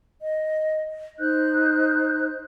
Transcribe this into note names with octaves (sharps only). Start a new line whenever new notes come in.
D#5
D#4 C5 F#6 G6